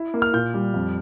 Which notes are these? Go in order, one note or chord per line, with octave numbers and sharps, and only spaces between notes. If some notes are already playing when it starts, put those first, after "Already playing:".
Already playing: E4
A#3
F6
A#2 G6
G3
F2